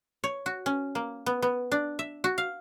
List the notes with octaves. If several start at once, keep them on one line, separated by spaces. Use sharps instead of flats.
C#5
F#4
C#4
A#3
B3
B3
D4
E5
F#4
F5